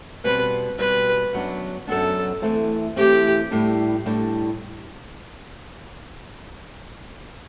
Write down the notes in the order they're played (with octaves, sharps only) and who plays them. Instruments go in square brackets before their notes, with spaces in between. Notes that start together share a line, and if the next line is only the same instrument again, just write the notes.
[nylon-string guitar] B2 G3 C4 [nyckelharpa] B4
[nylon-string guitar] B2 G3 C4 [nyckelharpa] B4
[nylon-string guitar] F#2 F#3 B3 D4
[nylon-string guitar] F#2 F#3 B3 D4 [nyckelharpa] A4
[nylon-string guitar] E3 A3 C4
[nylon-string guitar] E3 A3 C4 [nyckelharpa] G4
[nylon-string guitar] A2 G3 D4
A2 G3 D4